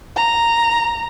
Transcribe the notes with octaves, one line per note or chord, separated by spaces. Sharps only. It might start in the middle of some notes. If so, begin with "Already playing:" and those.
A#5